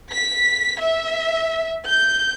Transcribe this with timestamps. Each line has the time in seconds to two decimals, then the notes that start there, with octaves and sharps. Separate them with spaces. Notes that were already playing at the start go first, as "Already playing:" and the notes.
0.10 B6
0.78 E5
1.89 G6